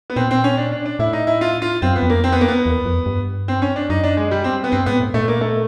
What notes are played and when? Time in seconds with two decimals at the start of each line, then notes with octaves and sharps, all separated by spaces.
0.10 B3
0.16 A#2 C4
0.31 C4
0.44 C#4
0.57 D4
0.72 D4
0.85 D4
0.99 A2 E4
1.13 D#4
1.27 E4
1.41 F4
1.62 F4
1.82 F#2 C4
1.96 B3
2.02 F2
2.10 A#3
2.24 C4
2.32 B3
2.41 A#3
2.48 B3
2.66 E2
2.85 F2
3.06 G2
3.48 C4
3.62 C#4
3.76 D4
3.89 F#2 D#4
4.03 D4
4.17 G#3
4.31 G3
4.44 C4
4.64 B3
4.72 G2 C4
4.86 G#2 B3
5.00 A2
5.14 A#2 A3
5.28 A#3
5.41 A3